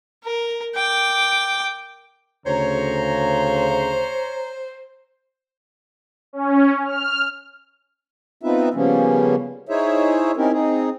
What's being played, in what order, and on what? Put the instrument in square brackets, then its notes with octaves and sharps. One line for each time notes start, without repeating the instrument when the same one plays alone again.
[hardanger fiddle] A#4
G5 D6
[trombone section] D2 C#3 [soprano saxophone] C5 [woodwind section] C#5 A#5
[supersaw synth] C#4
F6
[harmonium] B3 C4 D#4 F4 B4 E5
C#3 F3 G3 A#3 B3 C#4
D#4 E4 G#4 C5 C#5 E5
C4 C#4 D#4 E4 G4 A#4
C4 D#4 G#4